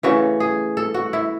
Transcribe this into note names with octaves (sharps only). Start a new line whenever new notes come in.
C#3 E3 A3 F#4
G#4
A4
F#4
E4